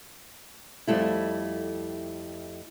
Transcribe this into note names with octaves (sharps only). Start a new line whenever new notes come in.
F2 G3 A3 E4